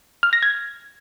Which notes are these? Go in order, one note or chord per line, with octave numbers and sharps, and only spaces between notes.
F6
A#6
G#6